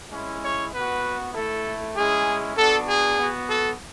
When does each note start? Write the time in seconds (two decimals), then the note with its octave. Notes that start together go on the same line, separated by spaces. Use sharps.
0.11 G#3 C#4 E4
0.42 C#5
0.73 B3 F#4 B4
1.34 A3 E4 A4
1.96 G#3 C#4 E4 G#4
2.57 B3 D4 F#4 A4
2.88 G#4
3.19 B3 F#4
3.50 A4